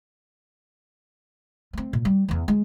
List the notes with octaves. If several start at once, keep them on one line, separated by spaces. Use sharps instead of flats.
A3 C4
A#2
G3
E2 E3
G#3